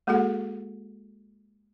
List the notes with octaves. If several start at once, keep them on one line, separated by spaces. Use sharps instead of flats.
G#3 A#3 F#4 G#4 A4 F#5